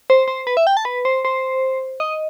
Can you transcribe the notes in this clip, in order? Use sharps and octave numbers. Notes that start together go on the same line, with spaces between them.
C5
C5
B4
E5
G5
A5
B4
C5
C5
D#5